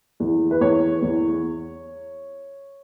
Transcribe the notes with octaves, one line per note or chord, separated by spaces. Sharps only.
E2
B4
E2 C#5
E2